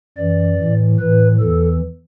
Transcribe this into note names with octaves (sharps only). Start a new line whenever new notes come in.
F#2 E3 D5
A2 E3
A2 E3 B4
E2 E3 A4